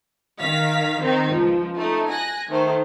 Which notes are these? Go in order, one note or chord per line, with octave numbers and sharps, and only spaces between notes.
D#3 F5 B6
D#3 C4 D#4
C#2 F3
A3 D#4
G#5 F#6 A#6
D#3 A3 C5